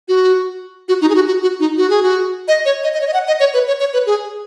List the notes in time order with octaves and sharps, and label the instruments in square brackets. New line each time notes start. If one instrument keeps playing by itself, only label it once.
[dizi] F#4
F#4
D#4
G#4
F#4
F#4
F#4
D#4
F#4
G#4
F#4
D#5
C#5
D#5
D#5
C#5
D#5
F#5
D#5
C#5
B4
C#5
C#5
B4
G#4